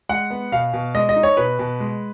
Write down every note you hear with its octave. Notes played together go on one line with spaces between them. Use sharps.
G#3 F#5
B3
B2 F5
B2
G#3 D#5
D#5
D#4
C#5
B2 B4
B2
G#3